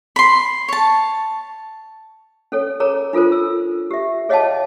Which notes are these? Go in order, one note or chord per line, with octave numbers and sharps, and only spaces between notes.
B5 C6
C#5 A5
C#4 A4 C#5
G#4 A#4 C#5 A#5
D4 F4 A4 A#4 C5
E6
G4 E5
G#4 C#5 D#5 F5 G5 A5